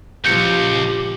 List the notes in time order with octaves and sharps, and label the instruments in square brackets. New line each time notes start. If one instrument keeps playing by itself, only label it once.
[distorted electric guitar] C#2 [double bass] A#2 F3 [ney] G4 [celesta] G6 C#7